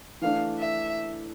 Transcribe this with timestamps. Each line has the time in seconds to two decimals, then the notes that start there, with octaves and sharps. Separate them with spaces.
0.22 E3 A3 D4 F5
0.59 E5